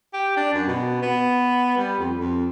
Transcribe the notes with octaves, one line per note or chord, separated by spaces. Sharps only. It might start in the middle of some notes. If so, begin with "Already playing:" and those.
G4
D4
F#2
B2
B3
G3
F2
F2